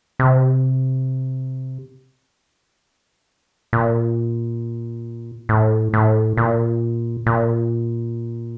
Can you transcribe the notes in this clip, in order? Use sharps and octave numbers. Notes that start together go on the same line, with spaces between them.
C3
A#2
A2
A2
A#2
A#2